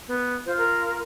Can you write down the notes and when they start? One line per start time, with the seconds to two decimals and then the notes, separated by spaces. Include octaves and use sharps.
0.08 B3
0.46 F4 C5
0.58 A#4